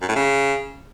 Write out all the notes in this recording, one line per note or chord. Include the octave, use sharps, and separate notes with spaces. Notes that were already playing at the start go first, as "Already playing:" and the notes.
F#2
A2
C#3